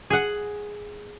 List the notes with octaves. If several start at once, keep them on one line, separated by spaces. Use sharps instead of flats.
G#4 F#5